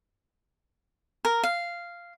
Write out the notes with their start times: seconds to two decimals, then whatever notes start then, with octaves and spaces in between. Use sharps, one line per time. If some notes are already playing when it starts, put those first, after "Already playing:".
1.25 A#4
1.43 F5